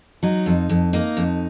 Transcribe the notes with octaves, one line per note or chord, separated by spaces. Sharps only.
F#3 D#4
F2
F2
A#3 D#4
F2